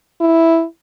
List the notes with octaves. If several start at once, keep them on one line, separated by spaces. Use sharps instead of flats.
E4